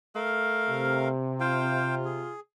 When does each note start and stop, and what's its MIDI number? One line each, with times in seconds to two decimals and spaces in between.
0.15 1.10 57
0.15 1.08 70
0.15 1.08 77
0.69 2.30 48
1.40 2.31 65
1.40 1.95 72
1.40 1.95 77
1.40 1.95 79
2.05 2.40 68